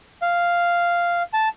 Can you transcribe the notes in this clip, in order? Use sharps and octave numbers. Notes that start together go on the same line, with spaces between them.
F5
A5